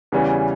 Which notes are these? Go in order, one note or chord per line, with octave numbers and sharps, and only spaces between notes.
E2 C#3 E3 G3 C#4